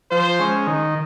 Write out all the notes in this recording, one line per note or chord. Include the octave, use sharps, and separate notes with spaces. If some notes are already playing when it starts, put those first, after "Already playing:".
F3 C5
G#3 C#4
D#3